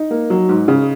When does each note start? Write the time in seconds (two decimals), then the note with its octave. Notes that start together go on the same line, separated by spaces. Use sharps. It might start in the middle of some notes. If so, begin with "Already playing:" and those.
Already playing: D#4
0.11 A#3
0.30 F#3
0.49 G#2
0.68 C#3